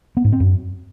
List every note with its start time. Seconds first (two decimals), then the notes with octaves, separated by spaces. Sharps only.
0.17 B3
0.25 G#2
0.32 C4
0.40 F#2